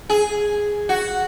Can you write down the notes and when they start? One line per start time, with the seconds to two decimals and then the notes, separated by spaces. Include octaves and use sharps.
0.10 G#4
0.89 F#4